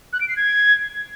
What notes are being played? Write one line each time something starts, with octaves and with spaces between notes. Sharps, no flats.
F#6
D7
C7
G#6